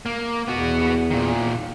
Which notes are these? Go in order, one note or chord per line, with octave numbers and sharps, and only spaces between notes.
A#3
E2 B3 F#4
A#2 D#3